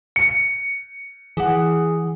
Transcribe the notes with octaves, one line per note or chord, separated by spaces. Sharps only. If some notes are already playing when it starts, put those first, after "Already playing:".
C#7
E3 G#4 F#5 D6